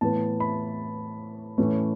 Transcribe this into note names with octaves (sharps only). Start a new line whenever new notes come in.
A2 E3 B3 A5
B5
A2 E3 A3 C#4